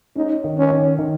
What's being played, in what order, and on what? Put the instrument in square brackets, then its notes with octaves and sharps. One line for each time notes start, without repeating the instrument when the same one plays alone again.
[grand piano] C#4 [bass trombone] D#4
[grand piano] D#3
[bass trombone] C#4
[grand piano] D#3
D#3